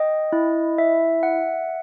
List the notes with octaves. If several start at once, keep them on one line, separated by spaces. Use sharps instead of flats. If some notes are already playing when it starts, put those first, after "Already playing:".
Already playing: D#5 G5
E4
E5
F#5